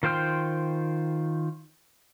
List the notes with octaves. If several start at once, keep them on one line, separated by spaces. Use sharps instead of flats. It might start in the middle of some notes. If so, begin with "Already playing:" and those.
D#3 F4 C5 G5 F6